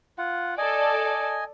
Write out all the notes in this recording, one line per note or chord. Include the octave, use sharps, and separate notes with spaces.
F4 F#5
A4 D5 D#5 G#5